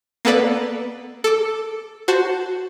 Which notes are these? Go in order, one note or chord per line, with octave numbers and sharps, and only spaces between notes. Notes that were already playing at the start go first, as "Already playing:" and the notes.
A#3 B3 A4 B4 D5
A4 D6
F#4 C5 A5